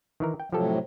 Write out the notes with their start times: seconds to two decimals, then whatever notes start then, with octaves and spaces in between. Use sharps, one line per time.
0.20 D#3 E3 A#4
0.40 G5
0.52 A2 C3 F3 F#3 G4 A4